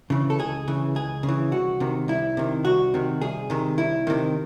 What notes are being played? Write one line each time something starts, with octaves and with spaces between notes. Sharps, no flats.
C#3 E3
A4
C#2 G#4
C#3 E3
C#2 G#4
C#3
E3
C2 F#4
C3 D#3
C2 E4
C3 D#3
C2 F#4
C3 D#3
C2 G#4
C3 D#3
C2 E4
C3 D#3